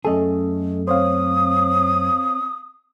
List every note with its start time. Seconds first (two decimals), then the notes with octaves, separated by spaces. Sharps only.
0.05 F#2 A3 C#4 G#4 A4 D#5
0.87 C4 C5 C#5 F5 D#6